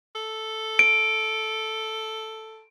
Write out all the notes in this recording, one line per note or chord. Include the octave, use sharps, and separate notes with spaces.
A4
D7